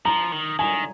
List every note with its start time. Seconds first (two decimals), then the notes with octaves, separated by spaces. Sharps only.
0.05 F3 A#5
0.32 D#3
0.59 D#3 G#5